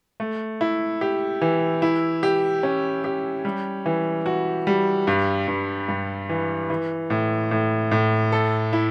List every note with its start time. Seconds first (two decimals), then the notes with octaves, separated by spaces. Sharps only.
0.20 A3
0.61 E4
1.01 G4
1.41 E3
1.82 E4
2.23 G4
2.63 C#4
3.04 G4
3.45 G3
3.86 E3
4.26 F#4
4.67 G3
5.07 G2
5.48 G2
5.88 G2
6.29 E3
6.70 E3
7.10 A2
7.51 A2
7.91 A2
8.32 A4
8.73 E4